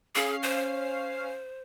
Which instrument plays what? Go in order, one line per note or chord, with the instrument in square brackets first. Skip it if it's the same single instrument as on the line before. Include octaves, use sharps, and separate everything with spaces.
[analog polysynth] C#4 F5 C7 [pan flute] G#4
[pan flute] C5